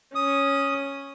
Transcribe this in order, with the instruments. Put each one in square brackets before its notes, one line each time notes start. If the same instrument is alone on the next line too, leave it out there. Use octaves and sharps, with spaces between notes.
[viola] C#4 [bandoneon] D#6